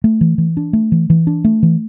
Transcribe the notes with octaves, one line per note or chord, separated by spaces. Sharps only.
A3
E3
E3
D4
A3
E3
E3
D4
A3
E3